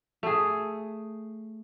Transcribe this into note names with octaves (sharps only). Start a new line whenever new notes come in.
A3 G#4